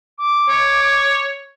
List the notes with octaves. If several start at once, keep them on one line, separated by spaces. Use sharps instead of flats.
D6
C#5